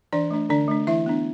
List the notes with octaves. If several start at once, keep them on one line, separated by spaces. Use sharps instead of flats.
E3 D4 D5
A3 D4
D3 D4 D5
A3 D4
E3 E4 E5
B3 D4